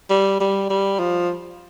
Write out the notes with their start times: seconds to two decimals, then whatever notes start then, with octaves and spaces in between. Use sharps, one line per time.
0.10 G3
0.40 G3
0.70 G3
0.99 F3